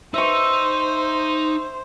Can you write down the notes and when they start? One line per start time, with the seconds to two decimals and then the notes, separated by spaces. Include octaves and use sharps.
0.14 D#4 C5 E5 C#6